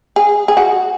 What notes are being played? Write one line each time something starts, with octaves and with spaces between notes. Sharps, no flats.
G#4
G#4
F#4